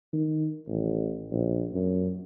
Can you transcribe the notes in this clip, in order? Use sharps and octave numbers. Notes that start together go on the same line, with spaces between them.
D#3
A1
A#1
F#2